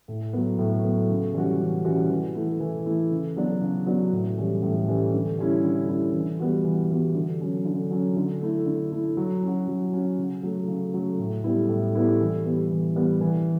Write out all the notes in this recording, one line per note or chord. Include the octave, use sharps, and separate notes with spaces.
A2
F#3 B3
A2
F#3 B3
C#3
E3 G3 C#4 F#4
C#3
E3 G3 C#4 F#4
E3
A3 E4
E3
A3 E4
C#3
F#3 B3 D4 F#4
C#3
F#3 B3 D4 F#4
A2
E3 G3 C#4
A2
E3 G3 C#4
D3
G3 C#4 E4
D3
G3 C#4 E4
E3
G3 B3 F#4
E3
G3 B3 F#4
D3
F#3 C#4
D3
F#3 C#4
D3
A3 E4
D3
A3 E4
F#3
C#4 F#4
F#3
C#4 F#4
C#3
F#3 A3
C#3
F#3 A3
A2
G3 B3 E4
A2
G3 B3 E4
E3
G3 B3
E3
G3 B3
E3